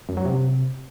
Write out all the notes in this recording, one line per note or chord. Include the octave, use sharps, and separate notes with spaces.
F#2
F#3
C3